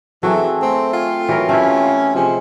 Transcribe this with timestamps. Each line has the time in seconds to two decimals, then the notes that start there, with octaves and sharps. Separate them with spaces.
0.23 E3 F#3 A3 C4 G#4
0.62 A3 C4 F5
0.93 F4 G5 G#5
1.29 E3 F#3 A#4
1.49 A3 C4 C#4 E4 G4
2.15 C3 F3 G#3 C5